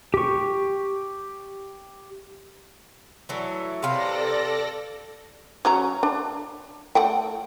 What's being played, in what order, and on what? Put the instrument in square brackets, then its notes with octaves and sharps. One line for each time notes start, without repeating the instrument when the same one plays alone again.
[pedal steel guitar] G4 C#6
[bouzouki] E3 F#3 A3
[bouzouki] C3 B4 F5 [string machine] A4 D5 A#6
[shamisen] F#3 C#4 A#5
D4
A3 F#5 G5